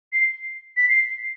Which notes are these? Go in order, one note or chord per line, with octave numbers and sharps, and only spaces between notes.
C7
B6
C7